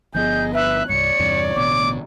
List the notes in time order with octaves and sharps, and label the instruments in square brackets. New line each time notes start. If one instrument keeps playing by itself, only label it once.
[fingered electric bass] G1 F3 B3 [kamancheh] G#4 D#5 [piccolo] G6
[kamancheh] B4 F#6 [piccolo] E5
[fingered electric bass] C2 G2 [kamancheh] C#5 D5 [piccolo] C#7
[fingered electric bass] E2 G2 C3
[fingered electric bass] A1 B2 D3 [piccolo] D6